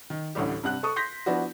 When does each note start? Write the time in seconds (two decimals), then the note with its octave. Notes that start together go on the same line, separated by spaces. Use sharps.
0.10 D#3
0.35 A1 D2 A2 G3 G4
0.63 G2 C3 F#5 F#6
0.83 A4 C#6 D#6
0.96 C6 G6 A#6 B6
1.26 F3 B3 D4 E4 F#4